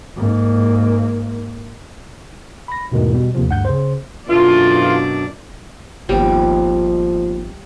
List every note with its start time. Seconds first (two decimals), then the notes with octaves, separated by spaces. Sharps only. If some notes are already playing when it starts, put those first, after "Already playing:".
0.16 G#2 A#3
2.68 B5 A#6
2.92 E2 G#2 B2 D#3 E3 A3
3.14 B2 G3
3.35 D#2 C3 F3
3.48 D2 G2 F#5 G6
3.65 C#3 C5
4.29 F#2 B2 D3 E3 D4 F4
6.09 G#1 D#2 B2 D#3 F3 G3